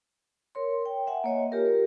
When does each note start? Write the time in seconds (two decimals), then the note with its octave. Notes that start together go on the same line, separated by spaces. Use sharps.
0.55 A#4 C#5 C6
0.86 G5
1.07 E5 F#5 G#5
1.24 A#3 C#5 D#5
1.52 F4 G4 A#4